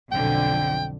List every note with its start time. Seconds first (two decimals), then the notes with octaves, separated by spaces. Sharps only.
0.12 B1 F2 D3 G5